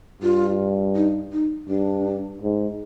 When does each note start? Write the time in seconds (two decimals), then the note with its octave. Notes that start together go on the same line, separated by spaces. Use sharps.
0.22 G2 F4
0.95 D#4
1.32 D#4
1.69 G2 D4
2.42 G#2